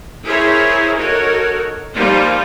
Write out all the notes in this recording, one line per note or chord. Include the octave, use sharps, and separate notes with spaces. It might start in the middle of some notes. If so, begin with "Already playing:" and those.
E4 G#4 A#4 C5 C#5 E5
D#4 F#4 A4 A#4 C#5
F3 G3 A#3 D#4 F4 C5